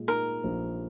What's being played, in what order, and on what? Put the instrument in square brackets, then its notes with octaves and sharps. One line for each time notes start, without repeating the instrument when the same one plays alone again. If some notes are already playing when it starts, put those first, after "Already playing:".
Already playing: [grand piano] A#2 G#3
[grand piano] D#4 [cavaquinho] A#4
[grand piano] A#1